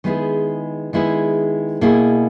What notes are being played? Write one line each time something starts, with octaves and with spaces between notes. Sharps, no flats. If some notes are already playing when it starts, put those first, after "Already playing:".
D#3 G#3 B3 E4 G#4
D#3 G#3 B3 E4 G#4
B2 A#3 E4 G#4